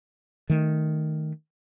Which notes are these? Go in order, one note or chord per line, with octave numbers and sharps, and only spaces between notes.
D#3 A3